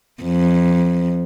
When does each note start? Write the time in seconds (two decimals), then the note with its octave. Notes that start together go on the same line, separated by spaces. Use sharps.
0.23 F2